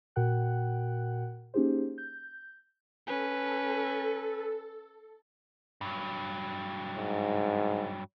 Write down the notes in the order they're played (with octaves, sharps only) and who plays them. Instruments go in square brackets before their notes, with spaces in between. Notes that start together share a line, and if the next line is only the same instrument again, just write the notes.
[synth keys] A#2 F#4 A#4 F#5 G5 F#6
A#3 C#4 D#4 G4 G#4 C5
G6
[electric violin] C#4 B4 [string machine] A4
[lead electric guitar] G2 F#3
[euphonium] G#2